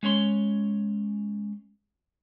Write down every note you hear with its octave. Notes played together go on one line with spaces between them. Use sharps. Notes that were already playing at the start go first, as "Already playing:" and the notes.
G#3 C#4 C#5 C6